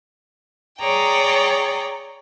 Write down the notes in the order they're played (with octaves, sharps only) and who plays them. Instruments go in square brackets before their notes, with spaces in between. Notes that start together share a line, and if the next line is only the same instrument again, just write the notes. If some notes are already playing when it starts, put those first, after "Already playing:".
[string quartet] G#4 C#5 D5 G5 A#5